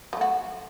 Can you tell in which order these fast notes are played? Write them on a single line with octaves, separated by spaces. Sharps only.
F#3 A3 F#4